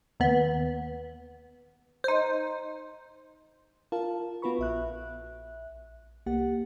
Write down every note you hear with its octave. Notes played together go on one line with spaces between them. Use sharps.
D#2 B3
D#4 C5
F4 A#4 F5 A5
B3 F4 F#4 B4 B5 C#6
A#1 E5 F#6
C2 A#3 G4 F#5